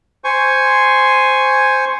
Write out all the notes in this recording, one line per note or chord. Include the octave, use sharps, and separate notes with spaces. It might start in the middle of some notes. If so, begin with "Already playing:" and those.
C5 G#5 C#6